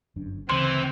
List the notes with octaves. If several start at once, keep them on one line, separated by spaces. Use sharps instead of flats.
G1 F#2 D4
D2 C#3 E3 C4 C6